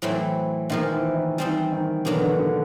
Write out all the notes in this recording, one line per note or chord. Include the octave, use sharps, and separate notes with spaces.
A2 E3 F#3 A3 C4 E4
A#2 D#3 F3 G#3
E3
D#3
E3 G3 C4 D#4
D#3
E2 B2 D3 F#3 A#3 D4
D3
D3